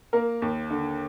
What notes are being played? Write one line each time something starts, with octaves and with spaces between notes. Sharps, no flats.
A#3 A#4
D#2
D3